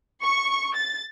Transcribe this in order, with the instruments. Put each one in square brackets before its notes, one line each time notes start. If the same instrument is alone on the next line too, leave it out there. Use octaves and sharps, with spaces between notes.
[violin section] C#6
A6